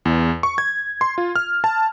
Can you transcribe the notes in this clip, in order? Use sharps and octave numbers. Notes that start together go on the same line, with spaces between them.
E2
C#6
G#6
C6
F4
F6
A5